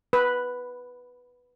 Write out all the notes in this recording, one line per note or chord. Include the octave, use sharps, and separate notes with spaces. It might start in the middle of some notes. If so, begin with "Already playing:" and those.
B4